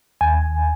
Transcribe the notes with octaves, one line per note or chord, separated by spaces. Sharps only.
D#2 G#5